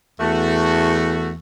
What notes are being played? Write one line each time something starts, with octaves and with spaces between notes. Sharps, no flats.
E2 A3 F#4